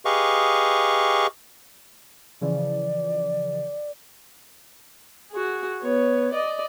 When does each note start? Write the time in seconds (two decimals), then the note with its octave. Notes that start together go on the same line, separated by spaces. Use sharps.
0.05 G4 G#4 B4 D#5 F5 C#6
2.41 C#3 E3 F3 D5
5.31 F#4 G#4
5.81 B3 C#5
6.33 D5 D#5